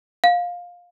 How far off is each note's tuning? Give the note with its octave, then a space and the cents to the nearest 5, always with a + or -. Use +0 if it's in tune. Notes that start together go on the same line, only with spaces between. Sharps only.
F5 +15